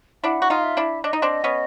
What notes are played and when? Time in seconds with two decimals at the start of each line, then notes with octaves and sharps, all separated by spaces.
0.24 D4 E4 F#5
0.42 F#4
0.50 D#4 F4
0.58 F5
0.64 E5
0.77 D4 E4
1.03 D4 D#5
1.13 D#4
1.22 C4 D4
1.44 B3 C#4